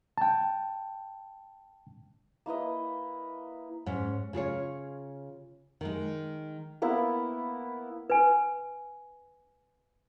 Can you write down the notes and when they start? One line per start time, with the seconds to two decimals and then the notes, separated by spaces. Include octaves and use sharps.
0.18 G5 A5
2.46 A#3 E4 B4 D#5
3.86 G#2 C#4
4.33 C#3 F4 G#4 C#5
5.81 D#3 G#3
6.82 A#3 B3 E4
8.10 B4 G#5